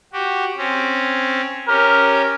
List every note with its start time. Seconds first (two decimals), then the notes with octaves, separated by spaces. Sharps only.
0.13 F#4 G4
0.57 C4 C#4
1.68 C#4 G4 A#4